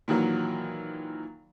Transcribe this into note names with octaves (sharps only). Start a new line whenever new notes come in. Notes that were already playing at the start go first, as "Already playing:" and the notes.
A#2 D#3 E3 F#3